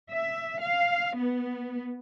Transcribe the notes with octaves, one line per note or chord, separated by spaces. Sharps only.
E5
F5
B3